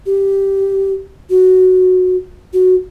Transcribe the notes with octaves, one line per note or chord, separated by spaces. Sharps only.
G4
F#4
F#4